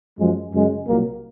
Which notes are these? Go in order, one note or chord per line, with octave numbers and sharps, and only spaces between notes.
F#2 F3 G#3
F#2 C#3 G#3
C2 A#2 F#3 A#3